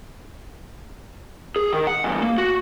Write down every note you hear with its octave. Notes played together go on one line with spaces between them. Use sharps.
G#4
D#3
F#5
E2 G2
A#3
F#4